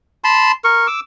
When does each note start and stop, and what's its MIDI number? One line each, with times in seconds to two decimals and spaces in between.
0.24 0.52 81
0.24 0.52 83
0.24 0.52 84
0.64 0.87 70
0.64 0.87 85
0.87 1.00 86
0.87 1.00 88